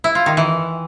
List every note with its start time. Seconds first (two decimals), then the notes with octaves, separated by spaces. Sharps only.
0.04 E4
0.15 F4
0.26 D#3
0.37 E3